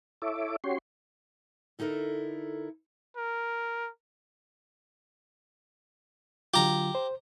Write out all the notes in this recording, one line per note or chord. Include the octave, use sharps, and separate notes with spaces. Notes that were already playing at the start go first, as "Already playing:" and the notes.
E4 A4 C#5 E5 D6
C#4 F#4 G4 C#5 C6
D3 D#4 E4 A4 A#4
A#4
D3 F#3 F4 G4 A#5
C5